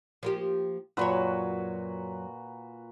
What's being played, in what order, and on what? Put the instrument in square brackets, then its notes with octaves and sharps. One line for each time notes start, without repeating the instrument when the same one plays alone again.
[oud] F3 A#3 G4
[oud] F#2 F#3 C#5 [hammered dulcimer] A#2 F#4 B4